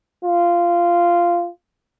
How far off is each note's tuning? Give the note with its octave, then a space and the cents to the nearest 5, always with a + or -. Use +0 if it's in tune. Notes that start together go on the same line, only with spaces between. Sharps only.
F4 -10